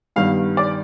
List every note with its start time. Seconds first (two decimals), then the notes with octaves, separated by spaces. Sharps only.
0.16 G2 D#3 G3 B3 F5
0.57 D5